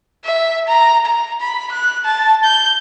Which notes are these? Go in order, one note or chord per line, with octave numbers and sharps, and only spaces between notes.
E5
A#5
A#5
B5
F#6
A5
G6